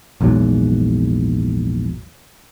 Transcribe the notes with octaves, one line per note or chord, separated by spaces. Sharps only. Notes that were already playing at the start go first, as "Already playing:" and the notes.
A#1 E2 G#2 F#3